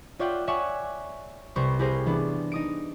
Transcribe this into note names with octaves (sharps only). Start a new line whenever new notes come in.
F4 C#5 D5 E5 F#5 G5
C#5 D5 E5 F#5 G#5 C#6
C2 B4 C5 C#6
E4 G4 G#4 A#4 C5
E3 B3 D4
D#4 D#6 D7